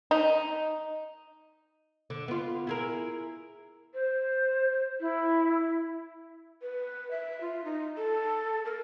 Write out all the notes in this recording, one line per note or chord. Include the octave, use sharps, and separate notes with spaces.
D#4
D3
B3 F4
E4 G#4 A#4
C5
E4
B4
E5
F4
D#4
A4
A#4